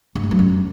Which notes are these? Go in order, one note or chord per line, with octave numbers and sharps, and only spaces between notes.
G2
A3
F#3
F#2